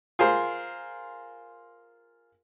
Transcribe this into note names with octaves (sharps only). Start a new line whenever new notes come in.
F4 G#4 A#4 C5